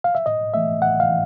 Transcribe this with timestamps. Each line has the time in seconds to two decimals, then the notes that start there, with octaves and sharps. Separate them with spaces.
0.04 F5
0.15 E5
0.26 A2 D#5
0.54 E3 A3 E5
0.82 A2 F#5
1.00 F5
1.09 E3